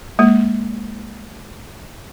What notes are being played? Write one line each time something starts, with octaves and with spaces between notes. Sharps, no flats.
G#3 A#3